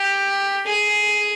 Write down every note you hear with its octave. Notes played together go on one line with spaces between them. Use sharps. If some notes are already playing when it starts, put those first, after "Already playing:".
Already playing: G4
G#4